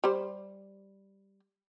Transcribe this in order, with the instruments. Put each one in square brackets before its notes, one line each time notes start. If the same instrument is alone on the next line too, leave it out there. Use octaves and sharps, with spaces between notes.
[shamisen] G3 C5